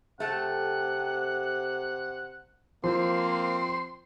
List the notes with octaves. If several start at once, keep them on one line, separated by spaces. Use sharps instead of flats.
C3 A3 A4 F#5
F3 A#3 C4 C6